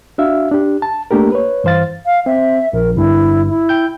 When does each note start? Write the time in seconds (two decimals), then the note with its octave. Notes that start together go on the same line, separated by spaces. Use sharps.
0.18 D4 F#4 E5 F5
0.52 D4 G4
0.82 A5
1.11 A3 A#3 D4 G4 A#4
1.32 B4 C#5
1.64 G2 E3 C5 F5 A6
2.06 F5
2.26 C4 E5
2.73 A#1 A#4
2.96 G1 G2 E4
3.48 E4
3.69 G5 G6